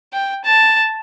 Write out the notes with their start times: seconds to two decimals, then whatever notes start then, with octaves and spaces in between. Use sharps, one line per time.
0.13 G5
0.45 A5